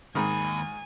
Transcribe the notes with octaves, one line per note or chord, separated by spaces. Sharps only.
D#2 G#2 D#3 G#5 B5